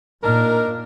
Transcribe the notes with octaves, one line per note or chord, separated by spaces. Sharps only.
A#2 D4 D#4 A#4